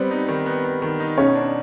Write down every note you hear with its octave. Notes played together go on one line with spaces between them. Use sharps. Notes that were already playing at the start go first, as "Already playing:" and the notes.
Already playing: G3 B3 C4
D#4
D#3
B3
B3
D#3
D#4
B2 C#4 C#5
D4